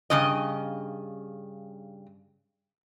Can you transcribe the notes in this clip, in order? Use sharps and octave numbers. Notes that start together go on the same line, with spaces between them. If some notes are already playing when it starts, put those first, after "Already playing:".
G2 C#3 D#5